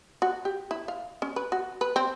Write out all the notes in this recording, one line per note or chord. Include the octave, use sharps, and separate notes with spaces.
F#4
G4
E4
F5
C#4
B4
F#4
B4
C4